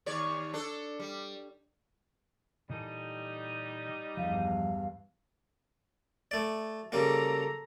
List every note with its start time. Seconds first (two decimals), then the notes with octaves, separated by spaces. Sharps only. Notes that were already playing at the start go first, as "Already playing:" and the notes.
0.06 D#2 C#5 D5
0.54 D4 A4
1.00 G3
2.70 A#2 E3 G3 D#4 A4
4.17 E2 G2 F3 E5 F5
6.31 A3 D5
6.92 C#3 G3 A#3 A4 A#5